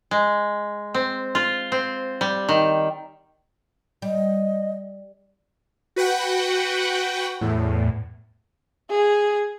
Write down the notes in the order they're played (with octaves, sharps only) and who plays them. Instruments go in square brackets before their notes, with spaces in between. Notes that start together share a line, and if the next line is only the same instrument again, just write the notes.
[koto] G#3
C4
F4
C4
G3
D#3
[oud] G3 [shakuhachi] D#5
[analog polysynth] F#4 B4 F#5 G5
E2 A2
[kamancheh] G#4